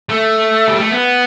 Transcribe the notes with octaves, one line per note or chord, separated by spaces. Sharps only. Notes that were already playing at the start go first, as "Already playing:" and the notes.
A3
G3
A3
B3